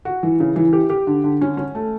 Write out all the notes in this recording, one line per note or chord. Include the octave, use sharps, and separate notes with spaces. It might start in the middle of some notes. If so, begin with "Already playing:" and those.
F#4
E3
C#3
E3
G4
G4
D3
D3
C#4
C#4
A3